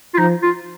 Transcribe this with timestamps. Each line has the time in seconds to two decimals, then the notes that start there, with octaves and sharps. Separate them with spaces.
0.14 F4
0.18 F3 D#4
0.43 F4